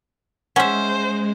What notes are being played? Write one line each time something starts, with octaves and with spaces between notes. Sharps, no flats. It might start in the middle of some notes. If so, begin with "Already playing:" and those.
G#3 C#4 C5 E5 F#5